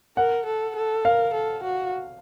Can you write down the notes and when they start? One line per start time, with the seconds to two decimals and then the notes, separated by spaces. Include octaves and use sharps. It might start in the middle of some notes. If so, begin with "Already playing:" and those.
0.17 A#4 F#5
0.46 A4
0.76 A4
1.05 A#4 F5
1.34 A4
1.63 F#4